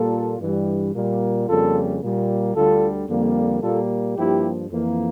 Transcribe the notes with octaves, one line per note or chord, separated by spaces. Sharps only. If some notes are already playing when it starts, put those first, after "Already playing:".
Already playing: A#2 G3 A#3 F4 A4
G2 E3 G3
A#2 G3 A#3
F2 C#3 G3 A#3 F4 A4
A#2 G3 A#3
D2 D3 G3 F4 A4
F2 D3 G3 A#3
A#2 G3 A#3 F4 A4
G2 F3 A#3 E4 G4
F2 E3 A#3